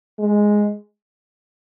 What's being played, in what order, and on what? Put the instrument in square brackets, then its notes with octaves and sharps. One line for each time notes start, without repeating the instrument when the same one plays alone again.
[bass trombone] G#3